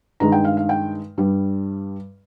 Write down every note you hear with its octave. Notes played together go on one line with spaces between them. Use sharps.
G2 D#3 G#3 A#5
G5
F5
F5
G5
G2 G3